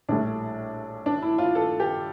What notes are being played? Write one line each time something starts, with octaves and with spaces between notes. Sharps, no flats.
A#1 A2 G3 D4
D4
E4
F4
A4
G4